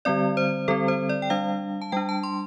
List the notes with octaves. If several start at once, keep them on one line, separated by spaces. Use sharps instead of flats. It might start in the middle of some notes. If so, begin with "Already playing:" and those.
D3 G3 C4 D5
C5
D3 G3 C4 A4
C5
D5
G5
G3 D4 F5
A5
G3 D4 G5
A5
C6